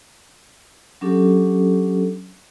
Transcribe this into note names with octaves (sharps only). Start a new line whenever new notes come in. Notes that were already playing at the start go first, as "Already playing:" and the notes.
F#3 C#4 D4 G4 A4